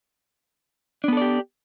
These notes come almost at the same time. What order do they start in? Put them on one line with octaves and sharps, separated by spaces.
D4 B3 A4 D5 G4